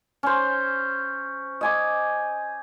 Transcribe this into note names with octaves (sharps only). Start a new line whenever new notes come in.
C#4 C5
D#5 G#5 D6